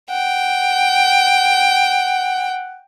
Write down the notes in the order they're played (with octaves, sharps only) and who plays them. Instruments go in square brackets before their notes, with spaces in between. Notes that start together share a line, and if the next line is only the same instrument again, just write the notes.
[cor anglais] F#5 [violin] G5